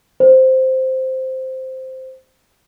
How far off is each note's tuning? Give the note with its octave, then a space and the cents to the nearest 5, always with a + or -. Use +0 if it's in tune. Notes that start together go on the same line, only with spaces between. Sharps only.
C5 -5